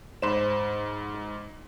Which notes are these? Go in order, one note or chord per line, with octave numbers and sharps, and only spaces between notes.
G#2 C5 B5 E7